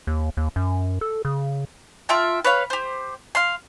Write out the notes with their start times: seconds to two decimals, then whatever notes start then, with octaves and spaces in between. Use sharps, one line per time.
0.07 D#2
0.37 D#2
0.56 F#2
1.01 A4
1.25 C#3
2.09 F4 E5 G5 A5
2.44 B4 C#5 F5
2.70 G4 C5
3.35 F5 C6